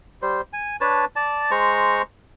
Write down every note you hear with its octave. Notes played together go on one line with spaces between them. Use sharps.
G3 C5
G#5
D4 B4 C#5 A5
D5 A5
G#3 C5 A#5 C#6